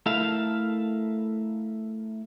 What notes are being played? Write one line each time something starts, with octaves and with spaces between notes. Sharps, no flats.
A3 E4 A4 A#4 E5 F5